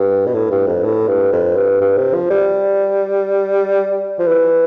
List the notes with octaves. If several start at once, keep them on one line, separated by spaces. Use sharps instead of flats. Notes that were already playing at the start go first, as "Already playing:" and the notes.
Already playing: G2
B2
A2
G2
F2
A2
G2
F2
G2
G2
C3
F3
G3
F3
E3